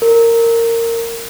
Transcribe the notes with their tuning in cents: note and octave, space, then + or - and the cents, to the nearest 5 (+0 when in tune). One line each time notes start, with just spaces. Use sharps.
A#4 -20